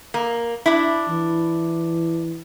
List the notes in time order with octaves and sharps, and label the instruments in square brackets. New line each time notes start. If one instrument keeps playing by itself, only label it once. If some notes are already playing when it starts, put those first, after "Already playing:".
[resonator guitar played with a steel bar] A#3
D4 E4
[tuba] E3